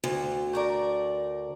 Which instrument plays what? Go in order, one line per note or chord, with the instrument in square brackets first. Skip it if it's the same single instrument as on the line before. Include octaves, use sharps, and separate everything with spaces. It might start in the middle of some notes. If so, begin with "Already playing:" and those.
[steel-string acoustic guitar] D2
[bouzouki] A3 A#4 D5